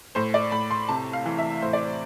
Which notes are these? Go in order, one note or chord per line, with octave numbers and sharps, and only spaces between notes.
A2 C5
D5
A2 B5
C6
C3 A5
F5
E3
E5
A2 C5
D5
C5